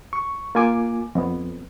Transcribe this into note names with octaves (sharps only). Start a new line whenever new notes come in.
C#6
A#3 F4 G#5 D6
F2 B3